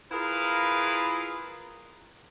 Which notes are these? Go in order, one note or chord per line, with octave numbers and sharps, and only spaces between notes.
E4 F4 G#4 A#4 B4 F5